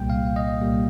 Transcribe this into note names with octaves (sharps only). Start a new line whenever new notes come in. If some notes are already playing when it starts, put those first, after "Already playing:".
Already playing: C2 A#2 G3 A#3 G5
F5
D#5
C2 A#2 G3 A#3